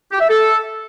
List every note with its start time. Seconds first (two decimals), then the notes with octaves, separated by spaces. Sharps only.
0.11 G4
0.20 E5
0.29 A4